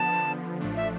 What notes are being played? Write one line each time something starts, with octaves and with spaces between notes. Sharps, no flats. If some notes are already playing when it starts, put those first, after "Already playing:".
Already playing: D3 F3 B3 A5
D3 F3 B3
A1 A2 F3 A3 D4
E5